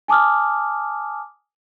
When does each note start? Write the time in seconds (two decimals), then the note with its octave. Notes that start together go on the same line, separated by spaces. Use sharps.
0.08 G#5 A5 D6 D#6 F6